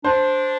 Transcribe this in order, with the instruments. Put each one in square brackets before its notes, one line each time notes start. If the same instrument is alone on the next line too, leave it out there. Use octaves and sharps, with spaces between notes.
[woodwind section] D4 [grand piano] C5